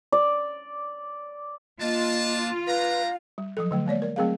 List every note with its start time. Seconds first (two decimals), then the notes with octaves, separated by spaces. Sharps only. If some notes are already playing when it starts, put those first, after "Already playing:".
0.12 D5
1.81 A#3 D4 F4 D#5 A5
2.67 G3 D4 B4 F5 A#5
3.38 G3
3.57 F3 F#3 A4
3.71 D3 F#3 A3
3.86 G#3 A#3 C#5 D5
4.02 A#4 D5
4.16 F#3 A3 C4 G#4 A#4 F5